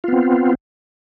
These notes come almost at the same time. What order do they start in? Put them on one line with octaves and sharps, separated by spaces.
F4 B3 C4